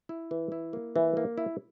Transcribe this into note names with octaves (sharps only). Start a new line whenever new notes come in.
E4
E3
E4
A#3
E3
A#3
E4